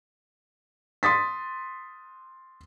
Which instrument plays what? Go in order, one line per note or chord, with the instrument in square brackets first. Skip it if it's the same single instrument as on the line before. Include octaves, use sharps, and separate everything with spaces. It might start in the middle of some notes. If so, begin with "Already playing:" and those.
[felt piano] C6 D#6 A6 B6